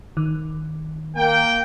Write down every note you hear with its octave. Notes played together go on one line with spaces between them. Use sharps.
D#3
A#3 G5